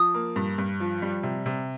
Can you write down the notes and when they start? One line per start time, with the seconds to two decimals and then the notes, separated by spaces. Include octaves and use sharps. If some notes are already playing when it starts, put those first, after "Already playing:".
Already playing: F3 D#6
0.14 A#3
0.36 G2
0.58 G2
0.80 F3
1.02 G3
1.23 C3
1.46 C3